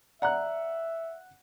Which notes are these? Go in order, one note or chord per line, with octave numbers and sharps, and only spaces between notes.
D5 E5 F#5 A#5 F#6